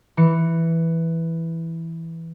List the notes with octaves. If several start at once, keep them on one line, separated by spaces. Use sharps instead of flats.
E3 C#7